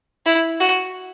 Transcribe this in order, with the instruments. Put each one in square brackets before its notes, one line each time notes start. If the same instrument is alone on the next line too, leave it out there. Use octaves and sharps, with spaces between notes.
[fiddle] E4
F#4